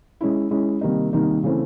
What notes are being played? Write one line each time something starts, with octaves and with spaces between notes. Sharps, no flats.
G#3 C#4 E4
G#3 C#4 E4
C3 D#3 G3 A#3 D#4
C3 D#3 G3 A#3 D#4
C#3 E3 A3 C4